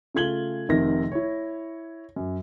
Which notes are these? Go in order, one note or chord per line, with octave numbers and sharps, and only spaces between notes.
C#3 A3 F4 G#6 F#7 G7
F1 C3 D#3 A#6
E4 C#5
F#2